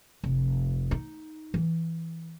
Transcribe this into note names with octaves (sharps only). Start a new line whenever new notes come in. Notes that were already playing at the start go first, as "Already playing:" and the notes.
F1
D#4
E3